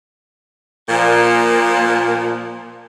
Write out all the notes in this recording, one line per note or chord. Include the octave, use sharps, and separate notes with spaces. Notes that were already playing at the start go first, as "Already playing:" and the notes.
A#2 F3